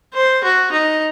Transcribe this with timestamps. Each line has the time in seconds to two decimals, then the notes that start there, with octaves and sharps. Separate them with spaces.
0.14 C5
0.44 F#4
0.72 D#4